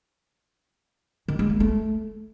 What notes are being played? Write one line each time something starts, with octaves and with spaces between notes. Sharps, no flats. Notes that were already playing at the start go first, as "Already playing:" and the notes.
D#3
G#3
A#3
A3